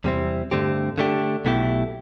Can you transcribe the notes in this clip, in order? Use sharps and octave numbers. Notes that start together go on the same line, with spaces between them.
E2 C3 G3 C4 E4
G2 D3 A3 C4 G4
D3 A3 D4 G4
B1 B2 A3 E4 G4